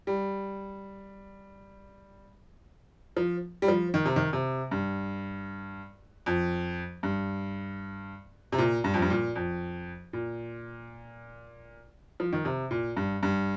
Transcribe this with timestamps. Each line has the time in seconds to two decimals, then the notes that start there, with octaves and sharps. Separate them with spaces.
0.07 G3
3.17 F3
3.62 G3
3.68 F3
3.94 D#3
4.05 C3
4.16 D#3
4.33 C3
4.71 G2
6.26 F2
7.03 G2
8.52 C3
8.58 A#2
8.84 G2
8.94 F2
9.02 G2
9.10 A#2
9.36 F2
10.13 A#2
12.20 F3
12.33 D#3
12.45 C3
12.71 A#2
12.97 G2
13.23 G2